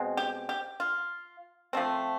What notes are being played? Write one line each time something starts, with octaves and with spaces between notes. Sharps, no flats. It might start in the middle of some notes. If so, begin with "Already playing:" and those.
Already playing: B2 G#3 C4
G4
G4
F4
F3 A3 C4